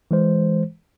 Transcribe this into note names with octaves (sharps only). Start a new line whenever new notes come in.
E3 G#3 C5